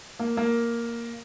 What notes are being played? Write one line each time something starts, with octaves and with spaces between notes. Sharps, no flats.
A#3
A#3